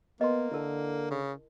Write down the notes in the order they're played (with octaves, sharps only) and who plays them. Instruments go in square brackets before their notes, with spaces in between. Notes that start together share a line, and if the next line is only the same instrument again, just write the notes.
[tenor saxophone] A#3 [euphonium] B3 [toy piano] D#5 C6
[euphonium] D3 [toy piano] E4 A#4 A5
[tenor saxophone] C#3